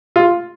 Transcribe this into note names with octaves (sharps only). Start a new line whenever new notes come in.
F4